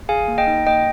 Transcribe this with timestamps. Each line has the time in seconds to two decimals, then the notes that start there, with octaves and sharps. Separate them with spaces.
0.09 G#4 F5 G#5
0.28 A#3
0.38 D#5 G5
0.47 D#4
0.67 A#3 D#5 G5